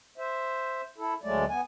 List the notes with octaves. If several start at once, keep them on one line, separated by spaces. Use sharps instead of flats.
C5 E5
E4 A4
D2 F#3 G#3 A3 D5
B3 G#5